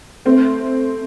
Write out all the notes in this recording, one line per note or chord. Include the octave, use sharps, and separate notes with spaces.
A3 C4